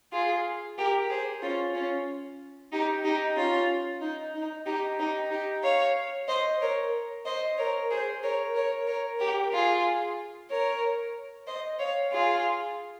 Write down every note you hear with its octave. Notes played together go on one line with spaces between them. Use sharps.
F4 G#4
G4 A#4
G#4 C5
C#4 F4
C#4 F4
D#4 G4
D#4 G4
C#4 F4
D#4
D#4
D#4 G4
D#4 G4
D#4 G4
C#5 F5
C5 D#5
A#4 C#5
C5 D#5
A#4 C#5
G#4 C5
A#4 C#5
A#4 C#5
A#4 C#5
G4 A#4
F4 G#4
A#4 C#5
C5 D#5
C#5 F5
F4 G#4